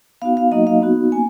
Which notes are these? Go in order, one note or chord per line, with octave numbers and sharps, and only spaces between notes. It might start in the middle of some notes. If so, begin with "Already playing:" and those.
B3 D#4 F#4 F5
F5
F#3 A#3 D#4 F#4 D#5
F5
B3 D#4 F#4
A#3 C#4 G#5